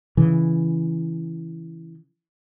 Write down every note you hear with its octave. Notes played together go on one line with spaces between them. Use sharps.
C#3 E3